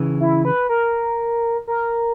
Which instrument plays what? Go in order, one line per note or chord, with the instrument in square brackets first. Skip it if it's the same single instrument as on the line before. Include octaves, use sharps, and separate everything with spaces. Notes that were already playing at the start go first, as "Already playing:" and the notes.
Already playing: [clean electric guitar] C#3 E3
[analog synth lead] E4
B4
A#4
A#4